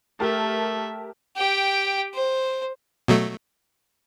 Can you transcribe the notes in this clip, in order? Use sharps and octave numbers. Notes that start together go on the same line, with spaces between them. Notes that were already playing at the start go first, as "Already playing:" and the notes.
A3 G4 A#4 E5 A5
G4 G5
C5
B2 F#3 A3